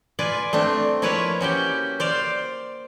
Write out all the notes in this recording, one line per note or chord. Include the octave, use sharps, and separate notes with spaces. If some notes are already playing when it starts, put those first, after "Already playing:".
F4 B4 D5 G#5
A3 C4 D4
F3 A#3 E4 B4 C#5
C#4 F#4 G4 G5
C5 D5 F5